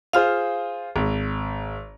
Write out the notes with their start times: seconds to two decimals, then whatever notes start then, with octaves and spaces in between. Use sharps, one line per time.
0.13 F4 G#4 C5 F5 F6
0.96 G#1